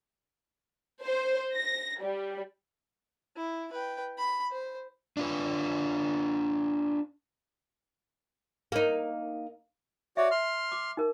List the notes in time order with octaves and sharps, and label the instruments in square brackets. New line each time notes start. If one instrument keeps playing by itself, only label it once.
[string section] C5
A#6
G3
[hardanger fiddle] E4
B4 G5
B5
C5
[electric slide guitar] D4 F4 B4
[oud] A#3 D#4
[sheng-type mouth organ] F#4 C#5 D5 [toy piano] E5
[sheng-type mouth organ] C6 F6
[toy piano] D6
D#4 A#4